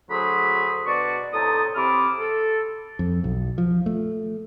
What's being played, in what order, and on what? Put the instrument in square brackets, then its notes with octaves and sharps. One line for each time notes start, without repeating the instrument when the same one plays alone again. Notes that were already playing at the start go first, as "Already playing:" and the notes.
[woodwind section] D2 F#3 G#4 C5 B5
B2 D4 F#4 D5 C#6
A2 C3 D#4 A5 D#6
C3 E4 C6 D6 F6
A4
[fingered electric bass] F2
B1
F3
A3